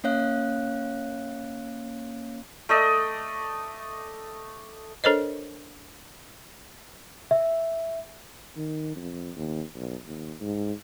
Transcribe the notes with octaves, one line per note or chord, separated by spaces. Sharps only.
A#3 C#4 C#5 F5 F#6
A3 D5 D#5
D4 A4 A#4 C5 C#5 D#5
E5
D#3
F2
D#2
B1
D#2
G#2